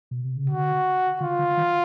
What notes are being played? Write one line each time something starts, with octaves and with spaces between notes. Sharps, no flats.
B2
C3
C#3
D3 F#4
D3 F4
D3
D#3